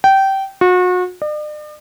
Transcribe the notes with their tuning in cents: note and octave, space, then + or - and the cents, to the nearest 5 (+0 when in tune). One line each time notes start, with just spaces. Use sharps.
G5 -20
F#4 -35
D5 +45